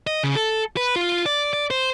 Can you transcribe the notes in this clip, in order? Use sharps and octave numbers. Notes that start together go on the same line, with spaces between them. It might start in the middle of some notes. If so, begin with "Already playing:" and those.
D#5
C#3
A4
B4
F4
D5
D5
C5